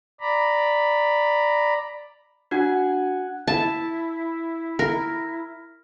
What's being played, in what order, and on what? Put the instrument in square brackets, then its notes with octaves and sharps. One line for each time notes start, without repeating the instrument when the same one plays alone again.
[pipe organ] D5 A#5 B5
[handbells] D4 F#4 [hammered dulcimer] F#5 G#5
[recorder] E4 [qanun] A5
[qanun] A#4